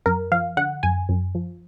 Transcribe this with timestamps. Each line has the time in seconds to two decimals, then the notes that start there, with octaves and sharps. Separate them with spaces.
0.06 F#2 A#4
0.32 F3 F5
0.57 D3 F#5
0.83 F#2 G#5
1.09 F#2
1.35 F3